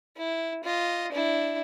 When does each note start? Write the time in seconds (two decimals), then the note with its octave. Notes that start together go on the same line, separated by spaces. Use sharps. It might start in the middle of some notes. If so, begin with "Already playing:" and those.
0.17 E4
0.63 F4 D#5
1.12 D4 E4